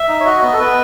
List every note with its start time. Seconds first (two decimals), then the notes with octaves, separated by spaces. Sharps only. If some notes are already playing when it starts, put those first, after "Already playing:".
Already playing: E5
0.09 D#4
0.20 C#5
0.25 F#4 D#5
0.42 B3
0.53 A4
0.59 B3 B4